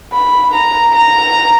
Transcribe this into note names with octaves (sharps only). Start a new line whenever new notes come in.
B5
A#5
A#5